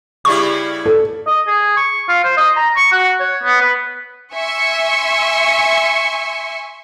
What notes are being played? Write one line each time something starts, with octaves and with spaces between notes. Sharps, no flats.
C#3 G3 E4 C#6
A4
D#5
G#4
C#6
F4
C5
D#5
A#5
C#6
F#4
C#5
B3
B4
E5 G#5 C6 C#6